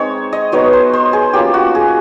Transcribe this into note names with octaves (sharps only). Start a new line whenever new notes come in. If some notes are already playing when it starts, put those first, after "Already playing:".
Already playing: G#3 C4 D#4 C#5
D#5
F#3 B3 D#4 C#5
C5
C5
G#4
F#3 A#3 C#4 F4 G4
F#4
G#4